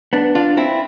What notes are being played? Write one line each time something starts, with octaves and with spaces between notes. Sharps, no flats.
B3 D4
D4 F4
C4 E4